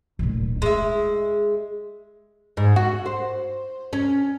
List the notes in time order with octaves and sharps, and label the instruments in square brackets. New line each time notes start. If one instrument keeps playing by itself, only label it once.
[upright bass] D1 A#2
[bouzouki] G#3 E5 [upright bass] E4
[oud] G#2
F#4
C5
C#4